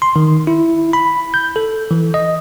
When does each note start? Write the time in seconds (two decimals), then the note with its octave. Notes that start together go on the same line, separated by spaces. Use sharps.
0.02 C6
0.16 D#3
0.47 E4
0.93 B5
1.34 G6
1.56 A4
1.91 E3
2.14 D#5